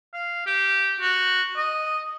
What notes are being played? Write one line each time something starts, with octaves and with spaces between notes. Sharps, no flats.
F5
G4
F#4
D#5